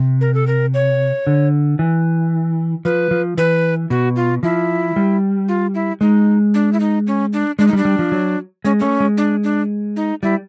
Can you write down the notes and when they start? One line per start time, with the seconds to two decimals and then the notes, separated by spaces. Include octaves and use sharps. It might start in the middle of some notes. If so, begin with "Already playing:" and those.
Already playing: C3
0.21 A#4
0.34 A4
0.47 A#4
0.74 C#5
1.27 D3
1.79 E3
2.85 F3 B4
3.11 F3
3.37 E3 B4
3.90 B2 F#4
4.16 F4
4.43 F3 E4
4.96 G3
5.48 F4
5.74 E4
6.01 G#3 D#4
6.54 D4
6.73 E4
6.80 D#4
7.07 C#4
7.33 D4
7.59 G#3 D4
7.68 D#4
7.73 G3
7.77 D4
7.85 G3
7.99 F3
8.12 F#3
8.64 G#3 C#4
8.80 A3 C#4
9.00 G#3
9.17 D4
9.44 D4
9.96 D#4
10.23 G3 E4